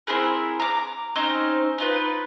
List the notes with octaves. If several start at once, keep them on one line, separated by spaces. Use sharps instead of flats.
C4 E4 G#4 A#4
A#5 D6
C4 C#4 D#4 C5
D#4 F4 B4